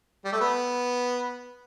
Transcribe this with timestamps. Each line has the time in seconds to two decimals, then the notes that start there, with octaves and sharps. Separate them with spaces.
0.25 G3
0.32 A3
0.41 B3